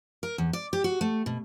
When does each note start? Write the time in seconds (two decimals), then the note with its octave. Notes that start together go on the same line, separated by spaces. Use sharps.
0.23 A#4
0.38 E2
0.53 D5
0.73 G4
0.84 F#4
1.01 A3
1.26 B2